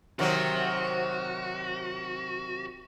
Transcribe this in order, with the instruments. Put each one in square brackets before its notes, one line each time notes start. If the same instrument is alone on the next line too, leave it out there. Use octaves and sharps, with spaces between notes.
[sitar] C3 D#3 F#3 [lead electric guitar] F#4